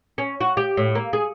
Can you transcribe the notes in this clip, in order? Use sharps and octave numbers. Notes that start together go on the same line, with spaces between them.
C#4
F#4
G4
A2
A#3
G#4